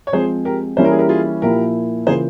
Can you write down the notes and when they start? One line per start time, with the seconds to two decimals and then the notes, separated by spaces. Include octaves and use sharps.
0.07 C#5
0.13 F3 G#3 C4 G#4 C5
0.45 G4 A#4
0.77 E3 G3 A#3 C#4 E4 C5
0.84 A#4
0.91 G#4
0.99 G4 A#4
1.09 F4 G#4
1.42 A#2 F3 A#3 E4 G4 A#4
2.07 C#3 E3 A#3 F4 G#4 C5